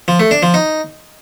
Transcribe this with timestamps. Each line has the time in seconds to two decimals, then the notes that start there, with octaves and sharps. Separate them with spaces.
0.08 F3
0.20 A3
0.31 D4
0.43 F3
0.54 D#4